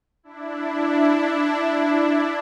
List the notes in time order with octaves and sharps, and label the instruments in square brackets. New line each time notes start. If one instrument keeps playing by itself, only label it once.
[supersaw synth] D4 E4